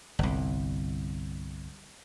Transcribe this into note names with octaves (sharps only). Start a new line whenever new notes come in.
G1 C2